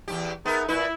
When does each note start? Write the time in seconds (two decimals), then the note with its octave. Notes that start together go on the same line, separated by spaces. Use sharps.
0.08 E2 G#2 G4
0.46 B3 D#4 G#4 A#4 E5
0.69 A#2 E4 B4